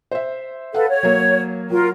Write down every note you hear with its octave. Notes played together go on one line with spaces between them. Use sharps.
C5 E5
A4 B4 F5 F#5
C#5
F#3 A#3
F#3 F4 A#4